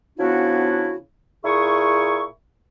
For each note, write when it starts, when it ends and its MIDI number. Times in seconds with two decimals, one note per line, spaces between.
0.19 0.96 49
0.19 0.96 53
0.19 0.96 59
0.19 0.96 62
0.19 0.96 64
0.19 0.96 66
1.44 2.23 46
1.44 2.23 64
1.44 2.23 68
1.44 2.23 85